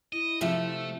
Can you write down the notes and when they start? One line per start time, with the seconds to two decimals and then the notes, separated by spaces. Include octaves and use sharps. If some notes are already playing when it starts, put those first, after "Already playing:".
0.13 E4 D#5
0.41 C3 F3 A3 E5